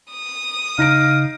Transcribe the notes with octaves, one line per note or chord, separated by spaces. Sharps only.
D#6
C#3 D#4 F5 A#6 D7